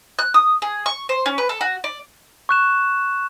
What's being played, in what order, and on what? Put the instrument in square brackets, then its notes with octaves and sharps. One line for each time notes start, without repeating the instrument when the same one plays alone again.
[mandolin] F#6
D#6
G#4
C#6
C5
C#4
B4
A4
F#4
D5
[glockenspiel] C#6 F#6 E7